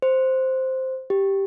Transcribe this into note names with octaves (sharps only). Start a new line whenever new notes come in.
C5
G4